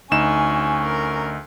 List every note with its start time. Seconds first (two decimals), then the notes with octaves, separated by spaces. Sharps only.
0.11 D2 C#4 D#4 G#5 E7
0.85 A#4